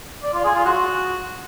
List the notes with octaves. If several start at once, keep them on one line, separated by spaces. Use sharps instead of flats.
D5
F4
G#4
F4
F#4